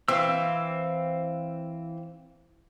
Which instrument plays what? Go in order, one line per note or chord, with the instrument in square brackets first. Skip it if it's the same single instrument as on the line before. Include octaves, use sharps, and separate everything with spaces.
[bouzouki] E3 C4 [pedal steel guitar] F5 E6